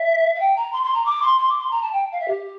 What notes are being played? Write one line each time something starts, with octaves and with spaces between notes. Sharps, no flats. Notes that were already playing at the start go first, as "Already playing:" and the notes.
Already playing: E5
F5
G5
A#5
C6
C6
A#5
D6
C6
C6
D6
C6
A#5
A5
G5
F5
E5
G4